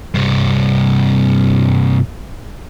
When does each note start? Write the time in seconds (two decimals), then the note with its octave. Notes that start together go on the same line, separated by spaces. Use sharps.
0.14 G2 C3